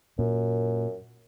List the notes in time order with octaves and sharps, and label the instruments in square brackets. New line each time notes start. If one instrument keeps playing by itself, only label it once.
[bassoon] F#2 [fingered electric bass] A#2